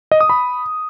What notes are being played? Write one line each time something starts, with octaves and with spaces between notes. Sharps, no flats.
D#5
D#6
B5